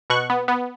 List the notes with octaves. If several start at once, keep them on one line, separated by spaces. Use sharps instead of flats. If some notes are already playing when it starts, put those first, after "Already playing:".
B2 C#6 F#6
B3
B3